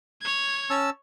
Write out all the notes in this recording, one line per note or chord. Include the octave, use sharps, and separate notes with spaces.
C#5 G#6
C#4 A5 E6